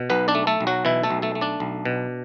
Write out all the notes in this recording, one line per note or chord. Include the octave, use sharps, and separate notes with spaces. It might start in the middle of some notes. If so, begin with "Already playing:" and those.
Already playing: B2
B1 B3 B4
D4 D5
A3
A3 A4
B1
F#3 F#4
B2 E3 E4
A3 A4
B1
A3 A4
A3
D4 D5
B1
B2